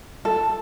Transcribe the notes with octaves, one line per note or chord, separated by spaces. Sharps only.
A4